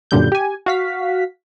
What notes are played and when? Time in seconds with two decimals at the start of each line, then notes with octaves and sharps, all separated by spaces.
0.11 F#2 A#2 D3 G3 G6
0.32 G4 G#5
0.66 F#4 F5 B6